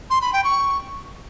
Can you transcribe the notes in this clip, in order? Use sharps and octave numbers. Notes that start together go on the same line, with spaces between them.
C6
B5
G5
C#6